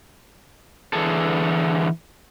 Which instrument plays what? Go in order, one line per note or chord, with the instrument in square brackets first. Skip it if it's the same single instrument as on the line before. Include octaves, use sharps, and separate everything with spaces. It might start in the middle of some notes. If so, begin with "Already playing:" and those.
[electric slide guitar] D3 E3 G#4 A4